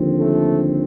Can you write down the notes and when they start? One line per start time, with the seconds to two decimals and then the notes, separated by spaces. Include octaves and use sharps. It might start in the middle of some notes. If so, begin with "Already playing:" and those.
Already playing: D#2 D3 F3 C4
0.18 A3 A4